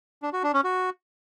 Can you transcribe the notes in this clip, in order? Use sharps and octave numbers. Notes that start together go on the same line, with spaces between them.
D4
F#4
D4
C#4
F#4